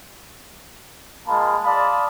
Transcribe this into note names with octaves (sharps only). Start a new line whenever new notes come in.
G#3 A#3 F4 A5 B5
D5 F5 A5 B5 C6 D#6